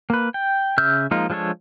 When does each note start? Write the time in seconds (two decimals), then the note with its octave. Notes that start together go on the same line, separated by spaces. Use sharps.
0.10 A#3 B4
0.34 G5
0.78 C#3 E5 E6 F6 G6
1.11 F3 G#3 A#3 D#4 F4
1.30 F3 G#3 D4 A4 C#5